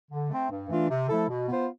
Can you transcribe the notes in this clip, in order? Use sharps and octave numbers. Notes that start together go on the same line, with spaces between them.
D3
A3 C4
G2
E3 A3 D4 F4
C3
F3 A3 E4 A4
B2
B3 F4 C5